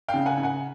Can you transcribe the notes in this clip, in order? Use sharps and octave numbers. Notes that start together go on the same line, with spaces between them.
F5 G5
C#3
F#5 G#5
C#3
F#5 G#5